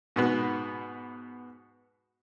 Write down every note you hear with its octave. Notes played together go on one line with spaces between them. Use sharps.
G#2 B2 B3